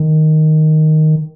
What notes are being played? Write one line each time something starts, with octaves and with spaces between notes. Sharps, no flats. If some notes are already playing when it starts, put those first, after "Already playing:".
Already playing: D#3